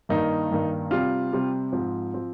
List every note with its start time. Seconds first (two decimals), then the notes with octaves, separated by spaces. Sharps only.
0.09 G2 D#3 A#3 D#4
0.51 G2 D#3 A#3
0.91 C3 G3 C4 F4
1.33 C3 G3 C4
1.72 G#2 F3 C4
2.14 F3 C4